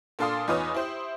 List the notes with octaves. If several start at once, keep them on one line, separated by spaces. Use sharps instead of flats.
A#2 D4 A4 F5 C6 D#6
E2 D#4 F4 B4 C#5 D#6
E4 G4 C5